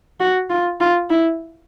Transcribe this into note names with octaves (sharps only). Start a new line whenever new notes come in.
F#4
F4
F4
E4